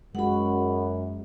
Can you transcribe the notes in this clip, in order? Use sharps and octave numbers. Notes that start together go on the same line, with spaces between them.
F#2 G#3 F#4 F#5 B5